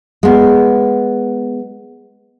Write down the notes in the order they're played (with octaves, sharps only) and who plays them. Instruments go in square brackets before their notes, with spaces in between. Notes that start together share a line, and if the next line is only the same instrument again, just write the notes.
[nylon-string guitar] G#3 B3